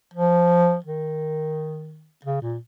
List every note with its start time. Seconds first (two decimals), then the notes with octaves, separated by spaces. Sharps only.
0.14 F3
0.85 D#3
2.25 C#3
2.42 A#2